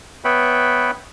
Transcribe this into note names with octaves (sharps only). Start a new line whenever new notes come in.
B3 B4 C#5 E5 G5 B5